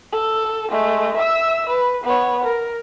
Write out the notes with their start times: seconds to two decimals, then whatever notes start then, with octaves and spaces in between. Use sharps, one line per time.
0.12 A4
0.70 G#3 A3
1.17 E5 E6
1.69 B4
2.04 B3 C#5
2.44 A#4